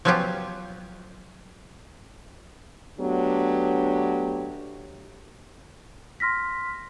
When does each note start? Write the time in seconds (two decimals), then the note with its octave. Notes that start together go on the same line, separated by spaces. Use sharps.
0.05 F3 F#3 B3 C#4 F4 G4
2.99 F#3 A3 B3 D4 G4
6.20 C6 F6 A#6 B6